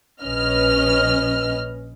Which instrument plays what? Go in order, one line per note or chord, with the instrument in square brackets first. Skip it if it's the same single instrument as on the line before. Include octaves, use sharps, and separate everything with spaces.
[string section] A#1 C#4 B4 D#5 F6